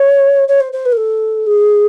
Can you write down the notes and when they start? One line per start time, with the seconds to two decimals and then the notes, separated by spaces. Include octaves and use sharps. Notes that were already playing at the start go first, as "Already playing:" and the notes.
Already playing: C#5
0.48 C#5
0.60 C5
0.72 C5
0.85 B4
0.92 A#4
0.97 A4
1.46 G#4